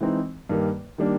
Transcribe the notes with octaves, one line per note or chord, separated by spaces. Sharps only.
E3 G#3 C4 D#4
G2 D#3 G3 A#3
D#3 G3 A#3 D4